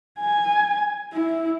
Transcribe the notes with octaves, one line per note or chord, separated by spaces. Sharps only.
G#5
E4